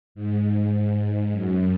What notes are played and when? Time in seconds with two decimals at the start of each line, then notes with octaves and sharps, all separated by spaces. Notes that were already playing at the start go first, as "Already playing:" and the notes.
0.15 G#2
1.32 F#2